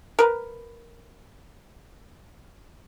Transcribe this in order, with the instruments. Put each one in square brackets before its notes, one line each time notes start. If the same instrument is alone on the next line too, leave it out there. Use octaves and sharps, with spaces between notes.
[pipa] A#4 B4